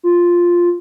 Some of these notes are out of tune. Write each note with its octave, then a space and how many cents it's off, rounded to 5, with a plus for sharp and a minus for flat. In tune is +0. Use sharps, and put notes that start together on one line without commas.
F4 +0